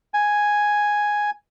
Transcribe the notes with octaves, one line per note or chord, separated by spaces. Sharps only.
G#5